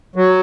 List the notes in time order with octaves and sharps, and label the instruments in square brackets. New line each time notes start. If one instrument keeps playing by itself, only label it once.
[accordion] F#3